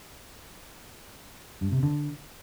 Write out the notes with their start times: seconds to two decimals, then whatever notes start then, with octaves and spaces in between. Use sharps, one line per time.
1.61 G2
1.72 C3
1.83 D3